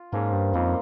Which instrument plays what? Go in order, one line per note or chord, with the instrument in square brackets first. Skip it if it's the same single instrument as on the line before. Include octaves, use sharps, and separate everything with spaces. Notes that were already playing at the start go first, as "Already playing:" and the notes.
Already playing: [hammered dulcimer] F4
[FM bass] G#2 [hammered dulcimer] F3 A#3 C#4
[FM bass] G2
[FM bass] F2 [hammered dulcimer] A#2 G3 C4 D#4